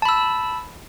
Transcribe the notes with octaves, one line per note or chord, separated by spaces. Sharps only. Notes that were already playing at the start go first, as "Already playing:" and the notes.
A5 B5 E6